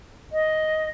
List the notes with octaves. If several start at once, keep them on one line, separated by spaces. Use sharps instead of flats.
D#5